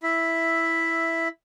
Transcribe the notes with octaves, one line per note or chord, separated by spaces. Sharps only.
E4 E5